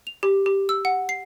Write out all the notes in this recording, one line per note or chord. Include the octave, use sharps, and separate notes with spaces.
F7
G4
G4
E6
F#5
C7